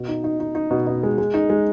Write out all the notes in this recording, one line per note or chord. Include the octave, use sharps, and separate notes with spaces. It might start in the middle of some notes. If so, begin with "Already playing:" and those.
Already playing: B2
D#4
D#4
D#4
D#4
B2
B2
G#3
G#3
D#4
G#3